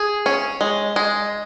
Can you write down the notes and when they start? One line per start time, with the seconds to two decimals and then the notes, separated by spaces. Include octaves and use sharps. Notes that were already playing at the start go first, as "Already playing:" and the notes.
Already playing: G#4
0.26 C#4
0.61 G#3
0.96 G#3